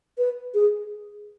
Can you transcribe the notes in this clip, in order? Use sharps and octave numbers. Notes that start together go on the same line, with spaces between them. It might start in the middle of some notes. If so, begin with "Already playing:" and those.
B4
G#4